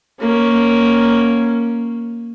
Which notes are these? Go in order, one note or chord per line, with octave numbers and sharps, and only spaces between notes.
A#3 C#4